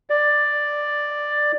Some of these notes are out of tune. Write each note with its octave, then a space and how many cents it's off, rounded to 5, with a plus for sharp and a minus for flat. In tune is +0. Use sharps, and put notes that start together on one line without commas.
D5 +5